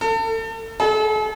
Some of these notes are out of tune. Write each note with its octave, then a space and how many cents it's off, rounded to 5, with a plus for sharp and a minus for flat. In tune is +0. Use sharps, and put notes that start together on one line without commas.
A4 +35
A4 -45